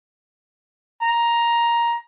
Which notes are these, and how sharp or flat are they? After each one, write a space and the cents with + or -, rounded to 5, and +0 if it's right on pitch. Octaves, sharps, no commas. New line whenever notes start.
A#5 +10